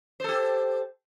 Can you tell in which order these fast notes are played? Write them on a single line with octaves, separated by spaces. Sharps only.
C5 A4 G4